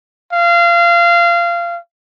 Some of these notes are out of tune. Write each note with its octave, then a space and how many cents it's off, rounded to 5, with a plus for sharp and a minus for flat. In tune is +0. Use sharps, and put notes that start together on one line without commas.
F5 -25